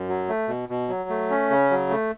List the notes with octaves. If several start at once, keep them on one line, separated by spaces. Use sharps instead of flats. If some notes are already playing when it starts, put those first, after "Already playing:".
Already playing: F#2
F#3
A3
B2
B2
F#3
A3
C#4
C#3
F#3
A3